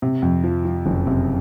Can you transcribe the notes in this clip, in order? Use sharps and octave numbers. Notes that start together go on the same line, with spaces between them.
C3
F2
F3
F3
F#1
C3